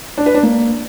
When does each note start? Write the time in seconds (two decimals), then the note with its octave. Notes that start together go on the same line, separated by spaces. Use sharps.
0.18 D4
0.26 B4
0.34 D4
0.43 A#3